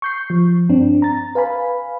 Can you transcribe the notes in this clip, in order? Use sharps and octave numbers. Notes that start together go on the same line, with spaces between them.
C#6 G6 C7
F3
G2 C4 D4
A#5 A6
B4 F5 G#5 B5